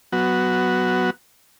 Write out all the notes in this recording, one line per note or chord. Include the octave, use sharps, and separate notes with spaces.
F#3 B3 F#4